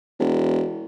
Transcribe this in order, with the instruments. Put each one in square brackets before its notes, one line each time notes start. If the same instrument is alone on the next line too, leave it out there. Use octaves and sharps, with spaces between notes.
[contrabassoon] E1